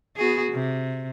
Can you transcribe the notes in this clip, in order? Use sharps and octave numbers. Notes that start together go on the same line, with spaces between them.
B3 F#4 G#4
C3